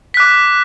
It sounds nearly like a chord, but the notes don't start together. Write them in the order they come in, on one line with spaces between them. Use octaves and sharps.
B6 F#6 D6